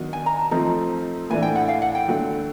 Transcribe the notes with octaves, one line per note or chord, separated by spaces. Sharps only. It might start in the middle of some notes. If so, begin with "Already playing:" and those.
Already playing: D#3 F#3 B3 D4
G#5
A#5
A5
F3 A3 C4 D#4 A#5
A2 E3 A3 D4 G#5
G5
F#5
F5
F#5
G5
D3 F#3 A3